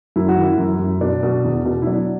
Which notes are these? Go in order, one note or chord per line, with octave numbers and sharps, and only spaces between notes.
F#2 E4
F#4
E3 E4
F#2
F#2
B2 D4
B2
E2
B2
E4
F#3 D4